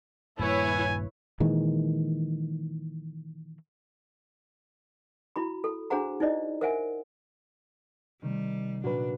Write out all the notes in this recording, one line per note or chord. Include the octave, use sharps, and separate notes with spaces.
D#1 G2 A#3 E4 B4 C#5 G#5
A#2 D#3 E3 G#3
E4 F#4 B5
A4
D4 F#4 G#4 C5 F#5 A#5
D#4 E4 C5 D5 D#5
A#4 C5 E5 F#5 G#5
C3 D#3 G3 A3
A#2 F#3 A#3 D4 F#4 B4